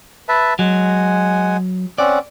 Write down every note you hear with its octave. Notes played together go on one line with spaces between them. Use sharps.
B4 E5 A5
F#3 G#3 F#5 G#5
C4 C#4 D5 F#5